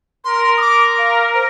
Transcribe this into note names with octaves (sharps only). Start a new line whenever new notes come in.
A#4 C6
D#6
D6
F5
C5